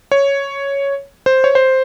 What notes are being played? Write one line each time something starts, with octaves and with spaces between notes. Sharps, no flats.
C#5
C5
C#5
C5